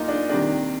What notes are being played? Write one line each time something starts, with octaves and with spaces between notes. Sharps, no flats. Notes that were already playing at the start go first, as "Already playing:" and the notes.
Already playing: A#2 D#4 F4
D4
C3 D#3 G3 D4